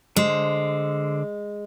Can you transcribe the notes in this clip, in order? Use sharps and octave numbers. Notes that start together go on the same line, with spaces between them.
D3 G#3 C5